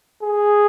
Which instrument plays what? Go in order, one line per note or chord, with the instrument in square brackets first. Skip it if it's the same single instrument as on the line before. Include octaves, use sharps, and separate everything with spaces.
[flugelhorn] G#4